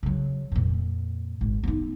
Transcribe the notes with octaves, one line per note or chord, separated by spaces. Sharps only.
C#3 F#3
F2 A#2
G#1
B3 D#4